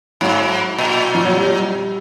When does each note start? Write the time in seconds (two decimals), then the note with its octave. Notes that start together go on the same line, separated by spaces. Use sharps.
0.21 G#2 F#3
0.78 A#2
1.15 F3
1.25 F#3
1.36 G3